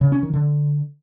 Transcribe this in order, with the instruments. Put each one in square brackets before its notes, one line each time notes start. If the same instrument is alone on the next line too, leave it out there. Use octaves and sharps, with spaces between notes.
[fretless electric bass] C#3
C#4
D#3
D3